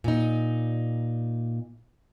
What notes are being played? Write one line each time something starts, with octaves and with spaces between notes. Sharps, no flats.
A#2 D#4